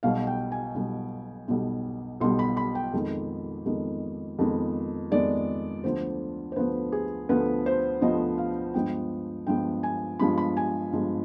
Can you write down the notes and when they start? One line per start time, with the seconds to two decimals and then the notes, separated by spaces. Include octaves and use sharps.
0.03 B1 B2 G3 B3 F5
0.27 G5
0.52 G#5
0.75 B1 B2 G3 B3
1.48 B1 B2 G3 B3
2.20 B1 B2 G3 B3 C6
2.39 B5
2.57 B5
2.75 G5
2.93 F2 D#3 G#3 B3
3.65 F2 D#3 G#3 B3
4.39 F2 D#3 G#3 B3
5.11 F2 D#3 G#3 B3 D5
5.84 D2 D3 F3 B3 C5
6.52 C5
6.56 D2 D3 F3 B3 B4
6.92 G#4
7.29 D2 D3 F3 B3 B4
7.66 C5
8.01 D2 D3 F3 B3 D#5
8.38 F5
8.74 G2 F3 G#3 B3 G5
9.47 G2 F3 G#3 B3 G5
9.83 G#5
10.19 G2 F3 G#3 B3 B5
10.38 B5
10.57 G#5
10.92 G2 F3 G#3 B3